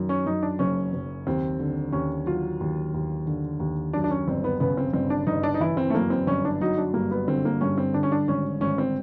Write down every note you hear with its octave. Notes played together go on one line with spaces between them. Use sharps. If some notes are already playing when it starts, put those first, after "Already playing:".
Already playing: F#2 D#3
C#4
F#2 D#4
D4
F#1 C#4
F#1
D#2 C4
D3
D#2 C#4
F#3 F4
D#2
D#2
D3
D#2
F#2 D4
D4
C#4
G1 C4
B3
C#3 B3
C4
G1 C4
D4
G1 D#4
D4
D#4
E3 E4
C4
A3
F#2 A#3
C4
G1 C#4
D4
F#3 D#4
D4
G2 A#3
B3
D3 C4
A#3
G2 C#4
C4
D3 D4
C#4
D4
G#1 C#4
G#1 C#4
C4